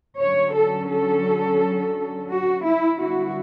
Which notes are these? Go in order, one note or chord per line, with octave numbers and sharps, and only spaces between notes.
D3 F#3 C#4 C#5
A4
A4
F#4
E4
F#2 D3 G3 B3 E4 F#4